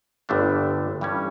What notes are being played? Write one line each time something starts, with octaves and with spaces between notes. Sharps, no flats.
G1 G2 D3 A3 D4
G2 E3 G3 C#4